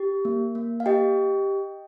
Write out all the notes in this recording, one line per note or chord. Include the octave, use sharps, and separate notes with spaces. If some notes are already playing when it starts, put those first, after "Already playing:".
Already playing: G4
A#3
A#3
F5
G4 D#5 G5